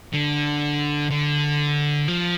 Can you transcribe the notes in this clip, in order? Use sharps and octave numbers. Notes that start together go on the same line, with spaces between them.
D3
D3
F3